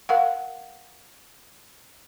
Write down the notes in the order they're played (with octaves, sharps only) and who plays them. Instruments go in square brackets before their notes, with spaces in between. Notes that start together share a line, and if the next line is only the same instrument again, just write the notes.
[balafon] A#4 F5 F#5